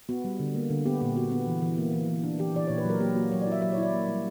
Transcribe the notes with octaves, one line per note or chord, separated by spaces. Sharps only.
B3 F#4
G3
D3
A#3
D3
B3 G4
A#2 G4
B3 F#4
B3
E3
E3
A#3
E3
E3
D4
E3 G4
E3 D5
A#2 C#5
B4
F#3 A#4
A#3 G4
A#3 F#4
F#3 C#5
D5
E4 E5
F#3 E5
C#5
E4
D5
A#3
G3